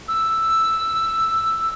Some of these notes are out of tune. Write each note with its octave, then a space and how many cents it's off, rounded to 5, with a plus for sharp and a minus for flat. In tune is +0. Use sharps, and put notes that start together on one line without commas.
E6 +5